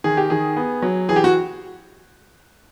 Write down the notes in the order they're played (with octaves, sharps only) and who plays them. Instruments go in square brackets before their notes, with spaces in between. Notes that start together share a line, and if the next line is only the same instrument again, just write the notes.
[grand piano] D#3 G#4
G4
D#3 G#4
B3
F#3
E3 G#4
G4
F#4